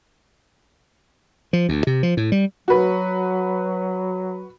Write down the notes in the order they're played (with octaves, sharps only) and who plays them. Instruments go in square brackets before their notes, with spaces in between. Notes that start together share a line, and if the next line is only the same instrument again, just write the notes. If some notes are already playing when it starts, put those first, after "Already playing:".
[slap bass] F3
D2
C3
F3
A2
G3
[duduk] F#3 [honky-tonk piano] F#4 B4